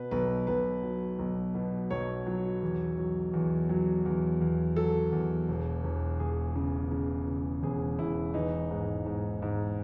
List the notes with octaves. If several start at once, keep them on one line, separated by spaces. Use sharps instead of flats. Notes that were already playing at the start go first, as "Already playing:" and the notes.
Already playing: B2 B4
B1 B4
B1 B4
F#3
B1
B2
B1 C#5
F#3
E2
F#3
E2
F#3
E2
E2
F#3 A4
E2
E1
E1
E1 G#4
C#3
C#3
C#3
E1 G#4
E1 E4
E3 D#4
G#2
G#2
G#2